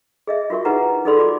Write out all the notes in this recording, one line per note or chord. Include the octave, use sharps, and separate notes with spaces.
G#4 D#5 E5
F4 F#4 A#4 E5 C#6
D#4 E4 G#4 B4 F#5 A#5
D#4 G#4 A4 D5 B5 C6
F4 F#4 D5 A5 D6